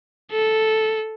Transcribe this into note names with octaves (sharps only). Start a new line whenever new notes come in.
A4